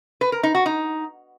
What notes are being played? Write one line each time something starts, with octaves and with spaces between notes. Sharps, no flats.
B4
A#4
D#4
F#4
D#4